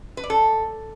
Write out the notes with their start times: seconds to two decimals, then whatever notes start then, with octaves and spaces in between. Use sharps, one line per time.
0.17 B4
0.24 D5
0.30 A4